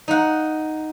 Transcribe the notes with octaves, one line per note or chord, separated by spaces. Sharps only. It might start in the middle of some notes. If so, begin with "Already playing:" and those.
D#4 F#5